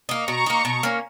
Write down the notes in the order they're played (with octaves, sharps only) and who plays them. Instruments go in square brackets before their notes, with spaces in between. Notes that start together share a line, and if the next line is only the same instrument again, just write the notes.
[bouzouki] A#3 D#4
[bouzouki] B2 [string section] A#5 C#6
[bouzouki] A#3 D#4
B2
A#3 C#4